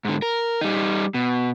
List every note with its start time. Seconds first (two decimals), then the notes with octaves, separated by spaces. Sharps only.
0.05 G#2 D3
0.22 A#4
0.61 G3 D#4
1.14 B2